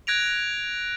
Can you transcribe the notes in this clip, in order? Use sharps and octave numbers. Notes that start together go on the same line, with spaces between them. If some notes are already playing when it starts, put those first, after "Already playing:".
F#6 G#6 A#6 D7 F7